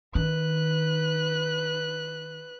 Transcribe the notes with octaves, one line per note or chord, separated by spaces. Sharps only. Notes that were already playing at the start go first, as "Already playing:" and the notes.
D#3 B4 F#6